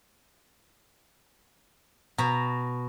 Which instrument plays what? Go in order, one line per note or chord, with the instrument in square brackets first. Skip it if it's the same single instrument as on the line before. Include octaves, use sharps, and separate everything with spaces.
[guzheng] B2 A#5